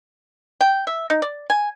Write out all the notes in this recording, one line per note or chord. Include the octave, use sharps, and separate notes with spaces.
G5
E5
D#4
D5
G#5